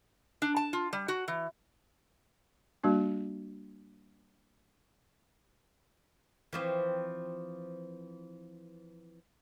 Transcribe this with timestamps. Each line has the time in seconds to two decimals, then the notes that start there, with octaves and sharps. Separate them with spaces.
0.42 D4
0.56 A5
0.73 F4
0.93 G3
1.08 F#4
1.28 E3
2.84 G3 A#3 D4 F#4
6.53 E3 F3 C4